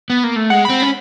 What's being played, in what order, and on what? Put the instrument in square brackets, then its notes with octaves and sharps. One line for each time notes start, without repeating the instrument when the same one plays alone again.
[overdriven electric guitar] B3
A#3
A3
[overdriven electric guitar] G#3 [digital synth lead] F#5
[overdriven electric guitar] C4 [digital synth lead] B5
[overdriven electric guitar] C#4 [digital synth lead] B5